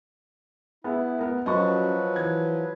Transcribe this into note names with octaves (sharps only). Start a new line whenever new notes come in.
B3 E4 G#4 E5
B3 A#4
F#2 F3 F#3 B4 D#5 A5 C#6
E3 G#6